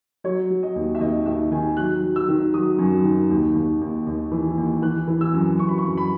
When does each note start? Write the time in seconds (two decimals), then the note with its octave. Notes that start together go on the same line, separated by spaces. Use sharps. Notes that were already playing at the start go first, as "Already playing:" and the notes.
0.24 F#3 C#5
0.50 F#3
0.63 D#5
0.76 D#2
0.95 E5
1.00 D#2 D#5
1.26 D#3 E5
1.51 D#3 G#5
1.77 F#3 F#6
2.02 F#3
2.16 E6
2.28 D#3
2.54 F#3 D#6
2.79 F#2
3.04 D#3
3.30 D#2
3.55 D#2
3.81 D#2
4.07 D#2
4.32 E3
4.58 D#2
4.82 E3 F#6
5.07 E3
5.21 E6
5.34 F#2
5.59 F#2 C#6
5.69 B5
5.78 C#6
5.84 F#2
5.97 B5